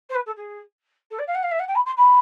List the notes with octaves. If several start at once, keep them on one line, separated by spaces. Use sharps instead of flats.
C5
B4
A4
G#4
A4
D5
F5
F#5
F5
E5
F#5
G5
B5
C6
B5